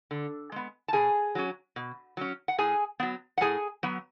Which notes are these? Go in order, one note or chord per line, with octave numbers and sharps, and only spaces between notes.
D3
G#3 B3
A5
B2 G#4 G#5
F#3 C#4
B2
F#3 C#4
F#5
A2 G#4 G#5
F#3 B3
F#5
A2 G#4 G#5
F#3 B3